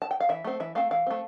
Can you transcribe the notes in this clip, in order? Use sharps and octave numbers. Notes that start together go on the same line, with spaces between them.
A5
G5
F5
E3 E5
A3 C4
E3 E5
A3 C4 F5
E3 F5
A3 C4